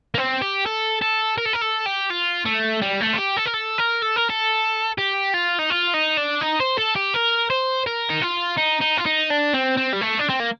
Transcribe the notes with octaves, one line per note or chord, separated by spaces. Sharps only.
A#3
C4
G4
A4
A4
A#4
A4
A#4
A4
G4
F4
A3
G3
A3
F4
G4
A4
A#4
A4
A#4
A4
A#4
A4
G4
F4
D#4
F4
D#4
D4
D#4
C5
A4
G4
A#4
C5
A#4
D#4
F4
D#4
D#4
F4
D#4
D4
C4
C4
G3
A3
D4
C4
A#3